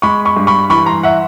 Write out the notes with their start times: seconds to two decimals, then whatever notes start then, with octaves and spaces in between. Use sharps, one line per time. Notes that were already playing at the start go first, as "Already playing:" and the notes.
0.02 G#3 B5 C#6
0.25 B5 C#6
0.36 G2
0.47 B5 C#6
0.70 E3 B5 C#6
0.86 A#5 C6
1.03 E5 F#5